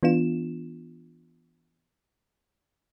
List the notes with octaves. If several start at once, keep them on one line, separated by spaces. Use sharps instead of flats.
E3 B3 D4 F4 E7